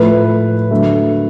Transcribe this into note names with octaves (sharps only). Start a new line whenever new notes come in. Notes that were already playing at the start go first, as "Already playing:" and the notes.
Already playing: A2 F3 A3 B4
D3 F#3 A3